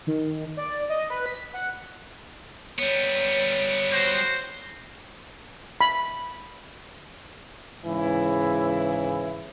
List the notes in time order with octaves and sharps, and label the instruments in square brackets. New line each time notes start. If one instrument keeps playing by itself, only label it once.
[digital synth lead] D#3
D5
D#5
B4
B6
F#5
[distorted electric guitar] G3 B3 [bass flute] C#5
[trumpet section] F#4 C5
[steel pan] B5
[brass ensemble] G#2 C#3 E3 E4